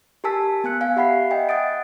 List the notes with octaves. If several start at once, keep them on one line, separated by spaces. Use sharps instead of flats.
G4 A#4 G#5 A5 E6 B6
B3 G#5 F#6 C#7
F5 G#5
G4 E5 F#5 B5 B6 C7
D#5 E5 G5 G#5
F#5 G5 D#6 A6 D7